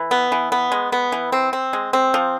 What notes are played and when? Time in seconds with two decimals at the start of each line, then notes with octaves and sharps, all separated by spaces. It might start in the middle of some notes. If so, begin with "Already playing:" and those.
Already playing: E3
0.11 B3
0.32 E3
0.52 B3
0.72 G#3
0.92 B3
1.12 E3
1.32 C4
1.53 C4
1.73 G#3
1.93 C4
2.14 F3